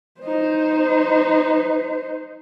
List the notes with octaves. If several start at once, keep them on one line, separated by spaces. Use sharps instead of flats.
D#4 C5